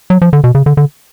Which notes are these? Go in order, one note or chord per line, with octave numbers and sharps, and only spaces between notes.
F#3
F3
D3
B2
C#3
D3
D3